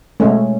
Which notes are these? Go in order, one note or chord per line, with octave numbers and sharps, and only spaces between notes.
B2 G#3 A3 C#4